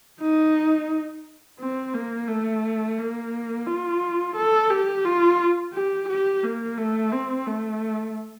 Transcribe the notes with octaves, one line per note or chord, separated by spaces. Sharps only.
D#4
C4
A#3
A3
A#3
F4
A4
G4
F4
G4
G4
A#3
A3
C4
A3